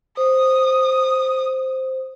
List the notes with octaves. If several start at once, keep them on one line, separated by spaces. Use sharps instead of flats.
C5 D#6